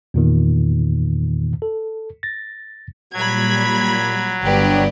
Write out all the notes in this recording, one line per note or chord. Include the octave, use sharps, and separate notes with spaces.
E2 A#2 D#3
A4
A6 A#6
A#2 F#3 G3 B5 G#6
G1 D4 G4 B4 C#5 D5 D#6